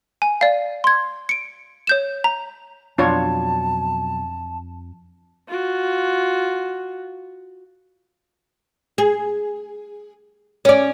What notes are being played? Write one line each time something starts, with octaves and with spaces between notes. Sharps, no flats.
G#5
D5 F5
C6 G#6
C#7 D7
C#5 G6 E7
A#5
F2 B2 F#3 D4 F4 C#5 A5
F4 F#4
G#4
C#4 D5